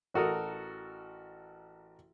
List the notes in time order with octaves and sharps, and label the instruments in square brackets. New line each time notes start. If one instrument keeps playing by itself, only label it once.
[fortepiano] A1 F#4 A4 A#4 D#6